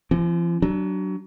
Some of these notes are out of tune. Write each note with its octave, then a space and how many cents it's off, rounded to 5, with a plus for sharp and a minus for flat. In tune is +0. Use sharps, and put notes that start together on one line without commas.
F3 -45 C4 +0
F#3 +25 D4 +0